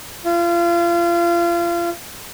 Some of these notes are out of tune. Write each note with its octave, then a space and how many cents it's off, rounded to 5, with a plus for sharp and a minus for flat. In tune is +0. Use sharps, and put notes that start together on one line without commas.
F4 -30